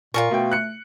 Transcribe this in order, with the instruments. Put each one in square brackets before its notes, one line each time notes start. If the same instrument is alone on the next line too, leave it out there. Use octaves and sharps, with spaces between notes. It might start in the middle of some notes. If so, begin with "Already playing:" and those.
[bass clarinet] A#2 [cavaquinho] F4 A4 C#6 [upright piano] A#4
[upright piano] B2 G5 [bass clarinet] A3
[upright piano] F#6 C#7